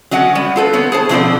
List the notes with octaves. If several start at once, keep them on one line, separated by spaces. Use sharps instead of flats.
F#3 C#4 D#5 F#5
G3
F4 A4 B4
B3 C#5
G#4 C5 A5
B2 F3 C4 G4 A4 D5